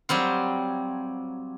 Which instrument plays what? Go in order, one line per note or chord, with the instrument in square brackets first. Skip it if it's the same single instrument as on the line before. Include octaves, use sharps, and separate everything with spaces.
[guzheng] F#3 G3 C4 F4